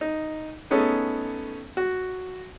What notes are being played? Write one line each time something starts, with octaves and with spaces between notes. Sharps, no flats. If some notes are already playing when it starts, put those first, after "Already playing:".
D#4
A3 B3 C#4 D#4 G#4 A4
F#4